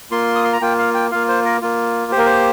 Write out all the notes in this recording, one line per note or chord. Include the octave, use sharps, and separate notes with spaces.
A#3 F4 C6
D#6
C6
A#5
A#3 F4 G5
F5
G5
A#3 F4 F5
C5
A#4
A#3 F4
A#3 G4 A#4 C5
C5